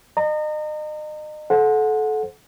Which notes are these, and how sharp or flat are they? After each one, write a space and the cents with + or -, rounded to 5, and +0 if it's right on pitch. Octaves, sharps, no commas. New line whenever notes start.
D#5 -35 A#5 -30
A4 -30 C5 +0 F#5 -20